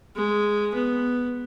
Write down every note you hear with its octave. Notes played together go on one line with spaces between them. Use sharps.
G#3
B3